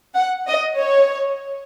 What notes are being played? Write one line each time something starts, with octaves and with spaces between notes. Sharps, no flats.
F#5
D#5
C#5